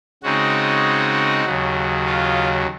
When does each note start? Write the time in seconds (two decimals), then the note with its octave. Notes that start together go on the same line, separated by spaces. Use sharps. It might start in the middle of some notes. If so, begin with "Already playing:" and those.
0.23 C#3 G#3 C4 D#4 F#4
1.45 D#2 C#3 F#3
2.06 F4